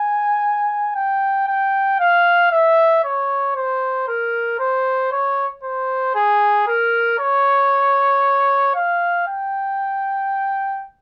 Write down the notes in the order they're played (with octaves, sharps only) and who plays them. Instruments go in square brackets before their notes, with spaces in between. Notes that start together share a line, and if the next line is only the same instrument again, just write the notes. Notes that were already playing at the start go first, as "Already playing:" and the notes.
Already playing: [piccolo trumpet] G#5
G5
G5
F5
E5
C#5
C5
A#4
C5
C#5
C5
G#4
A#4
C#5
F5
G5